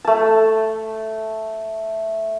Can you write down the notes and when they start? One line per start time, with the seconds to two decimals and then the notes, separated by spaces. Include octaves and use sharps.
0.05 A3 A5